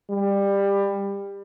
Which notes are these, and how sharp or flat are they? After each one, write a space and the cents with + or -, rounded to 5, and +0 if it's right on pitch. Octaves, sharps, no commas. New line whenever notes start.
G3 +20